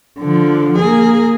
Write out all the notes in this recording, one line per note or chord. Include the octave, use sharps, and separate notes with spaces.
D3 F3
A#3 G#4